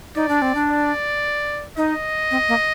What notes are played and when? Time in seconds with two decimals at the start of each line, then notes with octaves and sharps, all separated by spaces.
0.15 D#4 D5
0.29 D4
0.42 C4
0.55 D4
0.69 D5
1.77 D#4 D#5
2.31 C4
2.49 A#3